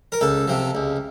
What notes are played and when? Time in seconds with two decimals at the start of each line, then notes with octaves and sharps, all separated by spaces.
0.12 A#4
0.21 C#2 A4
0.48 C3 F3
0.75 C#2